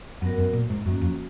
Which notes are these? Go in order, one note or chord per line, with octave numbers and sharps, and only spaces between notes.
F#2 F#3 B3 F#4 A#4
F#2
A#2
G#2
F#2 A#3 C#4 F#4
F2